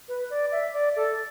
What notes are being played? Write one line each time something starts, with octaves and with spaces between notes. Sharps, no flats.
B4
D5
E5
D5
A4